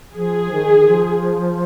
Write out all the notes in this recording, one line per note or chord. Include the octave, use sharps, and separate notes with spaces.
F3 G#4
D#3
D#3
F3